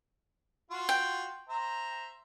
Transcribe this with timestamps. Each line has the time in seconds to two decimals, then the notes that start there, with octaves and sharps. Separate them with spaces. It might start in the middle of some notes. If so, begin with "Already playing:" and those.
0.71 F4 F#4
0.89 G5
1.49 C5 E5 A#5